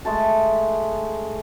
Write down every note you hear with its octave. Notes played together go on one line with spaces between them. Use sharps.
G#3 A3 A5